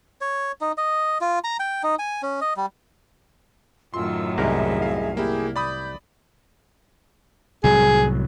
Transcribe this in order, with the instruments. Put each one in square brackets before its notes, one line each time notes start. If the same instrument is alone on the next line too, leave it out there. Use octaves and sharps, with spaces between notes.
[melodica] C#5
D#4
D#5
F4
A#5
G5
D#4
G#5
C#4
D#5
G3
[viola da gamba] F#2 A2 D#3 [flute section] F4 E6 [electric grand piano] C6
[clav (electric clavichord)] C2 A#4 [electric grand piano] G#2 [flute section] G#4 D#5 E5
[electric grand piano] F5
[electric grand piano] A#3 E4 [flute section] G4 G#4
[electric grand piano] D5 B5 D#6 [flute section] G6
[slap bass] C2 A2 F#3 [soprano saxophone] G#4